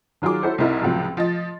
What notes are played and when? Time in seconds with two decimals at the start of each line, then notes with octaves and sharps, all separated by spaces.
0.22 D#3 F#3 F4 G#4 D6
0.43 E4 F#4 A4 C5 C#5
0.58 C2 C4 D#4 E4 A#4
0.81 C#2 A2 C3 F3 F#3
1.17 F3 D#5 A6